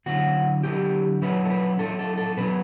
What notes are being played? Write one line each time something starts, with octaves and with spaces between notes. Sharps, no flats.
D3 F#3 C#4 E4 F#4
D3 F#3 C#4 E4 G4
F#3 C#4 E4 B4
A4
B4
F#3 C#4 E4 A4
A4
A4
B2 F#3 C#4 B4